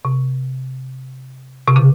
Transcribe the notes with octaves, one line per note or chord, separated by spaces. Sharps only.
C3
C3
C#3